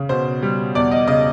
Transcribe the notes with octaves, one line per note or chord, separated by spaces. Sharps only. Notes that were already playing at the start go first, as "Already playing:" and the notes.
Already playing: C#3
B2 C5
G3
E2 D5
D#5
C#3 D#5